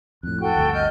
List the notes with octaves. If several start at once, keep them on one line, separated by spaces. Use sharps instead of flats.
F2 A2 F#6
F#4 A4 G5
G1 D2
D#5 F6 G6